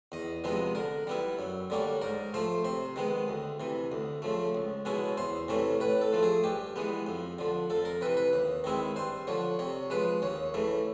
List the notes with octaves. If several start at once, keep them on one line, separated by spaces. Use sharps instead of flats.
E2 D#5
C3 F3 G#3 B3 D#5
D3 A#4
G3 B3 E4
F#2
D3 G3 A#3 C#4
G#2 A#4
F3 A3 C5
C3 C5
D#3 G#3 B3
D2
C3 E3
D2
C#3 F3 A3
C#2
B2 G#3 C#4 E4
E2 C5
C3 E3 A3 C#4
A2 B4
A4
F3 A3
G#4
G2 G4
E3 G#3 B3
F2
D3 F3
F2 A4
A#4
C3 E3 B4
B4
D#2
D#3 G#3 C4 E4
G2 C5
D3 F3 C#5
C3 C#5
F3 G#3 B4
D#2 C#5
C#3 E3 A3